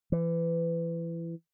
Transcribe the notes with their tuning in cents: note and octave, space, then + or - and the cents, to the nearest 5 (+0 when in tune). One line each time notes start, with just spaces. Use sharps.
E3 +25